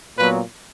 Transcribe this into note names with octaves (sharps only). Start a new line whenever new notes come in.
A#2 F#3 B3 B4